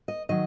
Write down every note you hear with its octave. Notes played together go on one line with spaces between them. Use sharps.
D#5
D#3 F#3 D#5